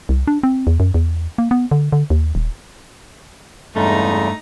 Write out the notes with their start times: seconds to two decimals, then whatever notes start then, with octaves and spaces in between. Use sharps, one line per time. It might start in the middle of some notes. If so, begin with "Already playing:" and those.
0.09 C2
0.28 D4
0.43 C4
0.67 E2
0.80 F#2
0.94 E2
1.38 A#3
1.51 B3
1.71 D3
1.92 D3
2.10 D#2
2.35 D#1
3.76 E2 G2 C#3 G#3 A3 D#4 A#5